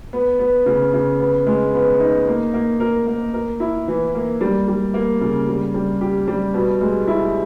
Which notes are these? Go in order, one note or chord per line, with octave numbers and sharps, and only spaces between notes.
B3
B3
C#3
C#3
B3
G#3
B3
D#4
A#3
A#3
A#4
A#3
A#4
E4
E3
A#3
G3
G3
A#3
C#3
G3
G3
G4
G3
B2
G#3
E4